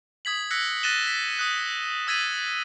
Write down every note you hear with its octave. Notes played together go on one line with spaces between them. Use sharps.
D#6 G#6 B6 F#7
E6 F#6 A#6 B6 C#7
F#6 A6 A#6 D#7 E7 G7
B6
D#6 F#6
D#6 E6 G#6 A6 B6 D#7